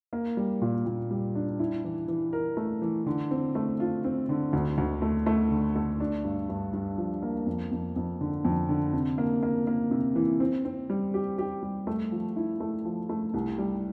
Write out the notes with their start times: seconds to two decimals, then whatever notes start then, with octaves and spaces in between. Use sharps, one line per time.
0.13 A#3
0.37 G3
0.62 A#2
0.86 A#2
1.11 G3
1.35 D4
1.59 E4
1.84 E3
2.08 E3
2.33 A#4
2.57 A3
2.82 E3
3.06 D3
3.31 C4
3.55 A3
3.80 F4
4.04 C4
4.29 D3
4.53 D2
4.78 D2
5.02 A3
5.26 A3
5.51 D3
5.76 A3
6.00 D4
6.24 G2
6.49 G2
6.73 G2
6.98 F3
7.22 A#3
7.46 F2
7.71 F2
7.96 F2
8.21 D3
8.45 F2
8.69 D3
8.93 C3
9.18 A#3
9.43 A#3
9.67 A#3
9.91 C3
10.16 E3
10.40 C4
10.65 C4
10.90 G3
11.14 G4
11.38 G4
11.63 G3
11.87 A3
12.12 F3
12.36 E4
12.60 A3
12.85 F3
13.09 A3
13.34 C2
13.58 G3